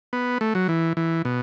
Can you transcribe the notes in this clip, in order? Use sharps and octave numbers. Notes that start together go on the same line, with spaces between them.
B3
A3
F#3
E3
E3
B2